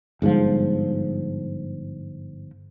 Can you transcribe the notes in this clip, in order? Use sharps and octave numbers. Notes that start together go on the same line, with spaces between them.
G1 G#2 B2 F3